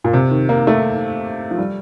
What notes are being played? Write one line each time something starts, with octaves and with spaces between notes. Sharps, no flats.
A#2
C3
D#3
A#3
A3
F3
G3